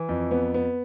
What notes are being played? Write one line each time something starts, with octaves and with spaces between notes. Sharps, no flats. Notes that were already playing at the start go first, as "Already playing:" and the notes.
Already playing: E3
F2
B3
B3